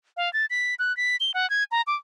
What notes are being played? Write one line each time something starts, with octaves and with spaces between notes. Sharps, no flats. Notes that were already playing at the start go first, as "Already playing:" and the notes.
F5
A6
B6
F#6
B6
G7
F#5
G#6
A#5
D6